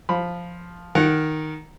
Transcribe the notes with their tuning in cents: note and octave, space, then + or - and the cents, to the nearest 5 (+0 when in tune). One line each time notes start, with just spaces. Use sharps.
F3 +0 B5 +0
D#3 +0 A#4 +0 F#5 +0